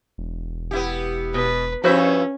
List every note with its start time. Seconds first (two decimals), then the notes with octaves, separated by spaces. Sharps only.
0.18 E1
0.71 B3 E4 G4
1.34 B2 B4
1.84 G2 F3 C#4 E4 F#4 B4 C5 E5